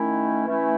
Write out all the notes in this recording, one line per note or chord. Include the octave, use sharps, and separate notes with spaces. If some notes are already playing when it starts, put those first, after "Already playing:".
Already playing: D#3 A3 C#4 E4
E3 A3 C#4 E4